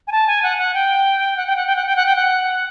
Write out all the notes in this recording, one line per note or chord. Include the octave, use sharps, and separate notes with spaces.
G#5
A5
G#5
F#5
F#5
G5
F#5
G5
F#5
G5
F#5
G5
F#5
G5
F#5